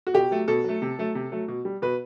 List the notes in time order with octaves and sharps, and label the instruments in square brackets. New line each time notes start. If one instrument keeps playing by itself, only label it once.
[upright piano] F#4
B2 G4
F#3 A3
B2 A4
F#3 A3
C3
F#3 A3
C3
F#3 A3
B2
G3
B2 B4